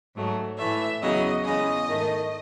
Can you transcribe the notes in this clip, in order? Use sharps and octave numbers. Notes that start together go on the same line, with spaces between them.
G#2 F#3 A3
A2 E3 A3 E5
E2 C#3 F#3 D#5
E2 C#3 G#3 D#5
G#2 D#3 A3